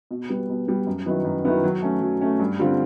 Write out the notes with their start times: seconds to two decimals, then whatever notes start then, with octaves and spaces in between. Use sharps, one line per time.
0.11 B2
0.30 G3 B3
0.49 B2
0.68 G3 B3
0.87 F#2
1.06 D#3 F#3 B3 E4
1.25 F#2
1.45 D#3 F#3 B3 E4
1.64 F#3
1.82 A3 C#4
2.01 F#3
2.21 A3 C#4
2.40 G2
2.59 D3 G3 C4 F4